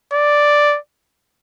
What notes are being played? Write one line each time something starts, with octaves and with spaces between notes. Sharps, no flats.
D5